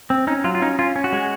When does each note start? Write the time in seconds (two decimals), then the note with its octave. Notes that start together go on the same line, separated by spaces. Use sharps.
0.10 C4
0.27 C#4 D#4
0.44 F#3 F4
0.55 F4
0.62 C#4 D#4
0.79 C#4 F4
0.96 C#4
1.04 F#4
1.12 G#3